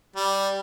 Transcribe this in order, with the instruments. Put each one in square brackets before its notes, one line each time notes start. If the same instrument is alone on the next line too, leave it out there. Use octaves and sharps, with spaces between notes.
[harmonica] G3